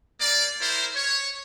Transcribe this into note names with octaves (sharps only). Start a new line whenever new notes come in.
A#3 D5
E4 A#4 C5
C#5